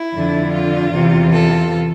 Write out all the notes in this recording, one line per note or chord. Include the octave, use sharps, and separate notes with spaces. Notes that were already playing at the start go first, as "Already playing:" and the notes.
Already playing: E4
F2 D3
F4
E2 C3 E3
F4 A4